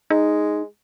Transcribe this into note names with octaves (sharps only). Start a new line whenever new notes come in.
G#3 D#4